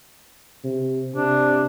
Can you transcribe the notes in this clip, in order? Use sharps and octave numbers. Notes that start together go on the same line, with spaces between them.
C3
C3 D4